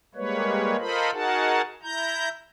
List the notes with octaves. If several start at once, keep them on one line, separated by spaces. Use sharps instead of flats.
G3 G#3 A#3 B4 C#5
F4 A4 A#4 C5 D#5 B5
D#4 F#4 G#4 A#4 F#5 A5
E4 A#5 G6